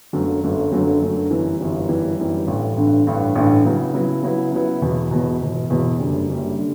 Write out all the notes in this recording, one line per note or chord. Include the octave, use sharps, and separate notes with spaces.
G1 F#2 D3 F#3 A3
G1 F#2 D3 F#3 A3
G1 F#2 D3 F#3 A3
G1 F#2 D3 F#3 A3
G1 F#2 E3 G3
G1 F#2 E3 G3
G1 F#2 E3 G3
G1 F#2 E3 G3
A1 G2 D3
A1 G2 D3
A1 G2 D3
A1 G2 D3
C#3 F#3 B3 E4
C#3 F#3 B3 E4
C#3 F#3 B3 E4
C#3 F#3 B3 E4
E1 E2 B2
E1 E2 B2
E1 E2 B2
E1 E2 B2
F#1 F#2 D3 G3
F#1 F#2 D3 G3
D3 G3